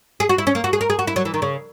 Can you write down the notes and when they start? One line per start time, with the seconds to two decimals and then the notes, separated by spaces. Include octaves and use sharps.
0.20 G#4
0.29 F#4
0.38 E4
0.47 C#4
0.55 A#3
0.64 F#4
0.73 G#4
0.81 A#4
0.90 G#4
0.99 F#4
1.07 E4
1.16 F#3
1.25 E3
1.34 D#3
1.42 C#3